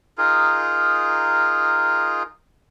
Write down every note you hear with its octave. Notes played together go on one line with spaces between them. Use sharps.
D#4 F4 G#4 A#4